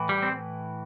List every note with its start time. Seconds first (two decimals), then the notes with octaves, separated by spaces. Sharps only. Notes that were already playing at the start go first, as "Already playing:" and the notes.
Already playing: A2 E3
0.09 G3
0.23 C4